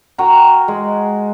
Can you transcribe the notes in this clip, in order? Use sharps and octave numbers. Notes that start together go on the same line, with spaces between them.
F#4 A#4 G5 A#5
G#3